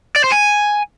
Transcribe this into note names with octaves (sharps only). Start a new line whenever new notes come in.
D5
C5
G#5